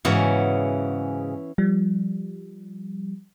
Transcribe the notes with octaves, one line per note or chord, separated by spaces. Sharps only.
G#2 C#3 E3 B3 C#4 F#4
F3 G3